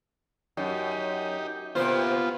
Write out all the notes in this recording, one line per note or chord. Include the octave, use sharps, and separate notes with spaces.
F#2 D#4 G4
C3 A#3 B3 F4 C5